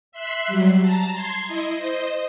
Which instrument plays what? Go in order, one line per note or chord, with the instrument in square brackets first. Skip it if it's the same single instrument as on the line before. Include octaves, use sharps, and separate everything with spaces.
[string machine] E5 C6 F#6 B6 C7
F#3 G3
A5 A#5
C6 G#6 C7
E4 D#5
C5 D#5